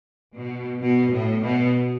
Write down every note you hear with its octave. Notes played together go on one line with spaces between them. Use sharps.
B2
B2
A2
B2